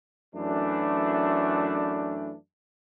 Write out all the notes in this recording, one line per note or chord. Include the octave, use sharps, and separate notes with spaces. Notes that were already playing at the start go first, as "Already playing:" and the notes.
F#2 E3 A3 D4